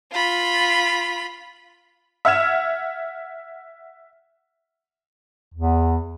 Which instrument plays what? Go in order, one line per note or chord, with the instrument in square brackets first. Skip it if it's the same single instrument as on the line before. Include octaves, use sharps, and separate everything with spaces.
[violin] F4 B5
[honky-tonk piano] E5 F#5 F6 G#6 E7
[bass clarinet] E2